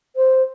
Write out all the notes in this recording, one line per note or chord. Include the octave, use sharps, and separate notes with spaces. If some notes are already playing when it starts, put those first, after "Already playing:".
C5